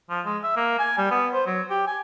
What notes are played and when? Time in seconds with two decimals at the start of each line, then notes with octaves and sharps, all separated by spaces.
0.10 F3
0.25 G#3
0.43 E5
0.56 A#3
0.79 G#5
0.98 G3
1.11 B3
1.33 C5
1.46 F#3
1.70 G4
1.87 G#5